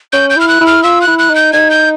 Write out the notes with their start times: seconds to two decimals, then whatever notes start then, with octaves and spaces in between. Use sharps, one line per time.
0.12 C#4 G6
0.30 G6
0.36 E4 F6
0.48 F#6
0.60 E4
0.66 F6
0.83 F4 E6
1.01 F#6
1.07 E4
1.19 F#6
1.30 D#4
1.35 G6
1.53 D#4 G#6
1.71 G6